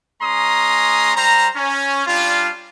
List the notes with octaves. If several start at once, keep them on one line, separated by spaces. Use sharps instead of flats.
G#3 C#4 A#5 C6 D#6
G3 C5 A#5
C#4
G3 D4 F4